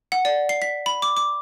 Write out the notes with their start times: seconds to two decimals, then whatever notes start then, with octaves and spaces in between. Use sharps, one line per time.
0.12 F#5
0.25 D5
0.49 C7
0.62 B6
0.86 B5
1.02 D6
1.17 D6